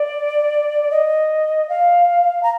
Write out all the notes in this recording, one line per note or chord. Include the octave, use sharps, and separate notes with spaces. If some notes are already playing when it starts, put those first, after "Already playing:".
Already playing: D5
D#5
F5
A#5